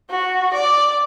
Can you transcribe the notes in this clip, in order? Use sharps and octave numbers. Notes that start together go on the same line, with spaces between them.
F#4
D5